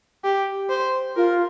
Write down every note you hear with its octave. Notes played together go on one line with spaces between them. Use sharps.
G4
C5
F4 A#4